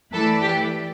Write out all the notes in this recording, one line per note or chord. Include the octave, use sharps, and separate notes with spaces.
E3 A3 E4 A4 B4 D5
G4